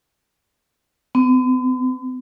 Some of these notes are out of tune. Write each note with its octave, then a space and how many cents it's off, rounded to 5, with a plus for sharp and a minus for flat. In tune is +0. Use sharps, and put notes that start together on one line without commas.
B3 +45